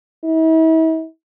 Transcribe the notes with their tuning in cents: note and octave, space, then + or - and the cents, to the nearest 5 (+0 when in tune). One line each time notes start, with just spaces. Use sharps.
E4 -45